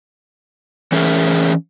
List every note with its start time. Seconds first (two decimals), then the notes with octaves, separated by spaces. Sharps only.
0.92 E3 C#4 G#4 A#4 E5